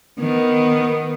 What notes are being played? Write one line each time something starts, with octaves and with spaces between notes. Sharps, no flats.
D#3 B3